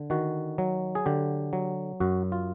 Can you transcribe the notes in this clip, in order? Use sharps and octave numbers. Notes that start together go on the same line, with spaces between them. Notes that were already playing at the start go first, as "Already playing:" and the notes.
Already playing: D3
D#3 F#4
F#3
G#4
D3 G4
F#3
F#2 F#4
F4